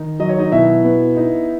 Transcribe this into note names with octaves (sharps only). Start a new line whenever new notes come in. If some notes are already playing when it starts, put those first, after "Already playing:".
Already playing: D#3 D#4
F#3 D#5
C#5
D#4 D#5
B2 E4 E5
B3
D#4